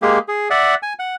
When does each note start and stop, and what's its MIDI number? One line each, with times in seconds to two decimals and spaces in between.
0.02 0.19 56
0.02 0.19 58
0.02 0.19 67
0.02 0.19 68
0.28 0.48 68
0.50 0.75 74
0.50 0.75 76
0.50 0.75 78
0.83 0.93 80
0.99 1.15 78